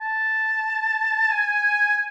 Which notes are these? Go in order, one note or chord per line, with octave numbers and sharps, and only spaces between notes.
A5
G#5